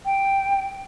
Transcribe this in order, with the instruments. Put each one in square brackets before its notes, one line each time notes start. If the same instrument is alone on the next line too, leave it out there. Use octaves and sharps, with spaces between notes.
[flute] G5